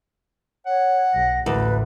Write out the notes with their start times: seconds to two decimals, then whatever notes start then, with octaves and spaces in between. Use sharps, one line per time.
0.66 C#5 F#5
1.14 B1 A#6
1.46 A1 D2 B4